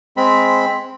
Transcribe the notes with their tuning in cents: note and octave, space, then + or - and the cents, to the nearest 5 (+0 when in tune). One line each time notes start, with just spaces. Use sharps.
G#3 +5 C4 +0 B5 +5